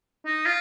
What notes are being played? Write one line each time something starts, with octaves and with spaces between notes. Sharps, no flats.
D#4
F4